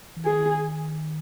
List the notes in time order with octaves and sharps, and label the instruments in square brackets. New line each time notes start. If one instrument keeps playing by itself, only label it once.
[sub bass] E3
[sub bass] D#3 [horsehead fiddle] G#4